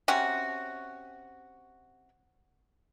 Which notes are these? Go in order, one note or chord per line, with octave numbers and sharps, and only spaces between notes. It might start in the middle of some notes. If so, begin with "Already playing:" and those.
C3 C#4 F#4